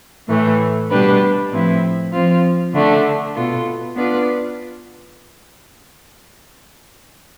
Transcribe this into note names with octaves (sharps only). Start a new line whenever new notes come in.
A2 E3 A3
B2 G3 D4 G4 B4
A2 F3 C4 E4 B4
F3 C4 F4
D3 A3 D4
B2 B3 F4 A4
B3 D4 F4 B4 D5